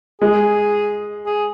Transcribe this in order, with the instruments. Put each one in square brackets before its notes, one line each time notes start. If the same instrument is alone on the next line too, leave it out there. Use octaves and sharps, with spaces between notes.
[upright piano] G#3 [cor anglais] G#4
[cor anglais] G#4